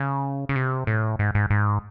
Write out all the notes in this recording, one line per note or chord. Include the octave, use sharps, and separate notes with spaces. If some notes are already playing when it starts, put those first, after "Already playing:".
Already playing: C#3
C#3
C3
A2
G#2
G#2
G#2